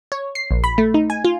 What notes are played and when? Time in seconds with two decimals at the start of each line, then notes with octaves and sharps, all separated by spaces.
0.12 C#5
0.35 C7
0.51 A#1
0.64 B5
0.78 A3
0.94 D#4
1.10 G#5
1.24 F4